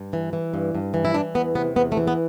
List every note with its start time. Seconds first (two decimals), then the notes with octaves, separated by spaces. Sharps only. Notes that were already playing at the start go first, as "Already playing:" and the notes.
Already playing: G2
0.13 E3
0.33 E3
0.54 G2
0.75 G2
0.94 E3
1.05 E4
1.14 E3 D4
1.35 E2 B3
1.55 C3 B3
1.76 E2 B3
1.92 A3
1.97 E3
2.07 B3